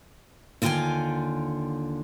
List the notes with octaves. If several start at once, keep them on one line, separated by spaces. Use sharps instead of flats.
D#2 D3 F4 F#4 G5 G#5